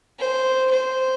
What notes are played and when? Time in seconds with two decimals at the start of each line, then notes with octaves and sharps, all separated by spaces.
0.19 C5
0.71 C5